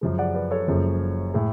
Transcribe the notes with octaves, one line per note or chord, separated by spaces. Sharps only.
F#2 C#3 F3 G#3
D5 F#5
B4 D5
A4 C#5
F#1 F#2 C#3 F3 G#3
A2 G#3